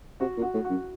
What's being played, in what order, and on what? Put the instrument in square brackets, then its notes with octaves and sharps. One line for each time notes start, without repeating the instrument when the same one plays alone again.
[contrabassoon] C3 [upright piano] F#4 F#5
[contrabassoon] A#2
[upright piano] F#4 F#5
[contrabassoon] A2
[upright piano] F#4 F#5
[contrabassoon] F#2